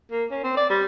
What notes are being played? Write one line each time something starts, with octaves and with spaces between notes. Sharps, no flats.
A#3
C#4
C4
D5
G3